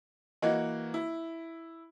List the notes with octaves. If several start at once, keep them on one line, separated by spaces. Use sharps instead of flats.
E3 A#3 F#4 D#5
E4